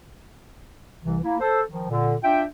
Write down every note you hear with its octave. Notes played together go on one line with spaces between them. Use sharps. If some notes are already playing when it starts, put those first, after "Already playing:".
C2 C3 E3
A#3 E4
A4 C5
D#3 F3
A#2 D3
D4 F4 E5 G5